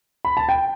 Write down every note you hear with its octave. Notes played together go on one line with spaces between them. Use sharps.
B5
A5
G5